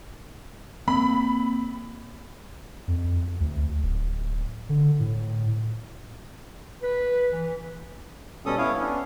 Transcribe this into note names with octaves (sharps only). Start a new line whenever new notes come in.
A#3 C4 B5
F2
D2
D1
D3
A2
B4
E3
B2 G3 C#4 A4 D#6
B3 E4 C#5 F5
B3 C#4 D4